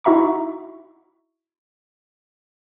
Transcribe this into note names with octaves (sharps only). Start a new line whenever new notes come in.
D#4 E4 F#4 E5 A#5 C#6